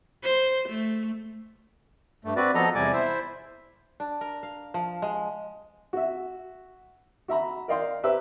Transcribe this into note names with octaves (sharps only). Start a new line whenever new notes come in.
C5
A3
G2 A3
C4 F#4 B4 D5
F3 B3 A4 D#5 A#5
E2 C3 G3 D5 G#5 D6
E4 C5 E5
D4
A#4
F5
F3
G#3
F#4 E5
F#4 E5 A#5 B5
A#4 D5 D#5 F5 G5 C6
G4 B4 C5 E5 A#5 E6